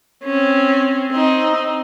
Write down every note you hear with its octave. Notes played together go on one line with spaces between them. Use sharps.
C4 C#4
C4 D#4